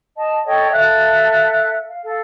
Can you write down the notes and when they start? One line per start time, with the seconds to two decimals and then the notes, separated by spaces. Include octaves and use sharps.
0.17 D#5 A5
0.46 A4 C#5 D#5 G5
0.72 A4 E5 F5 F#6
1.89 F5
2.04 A4 F5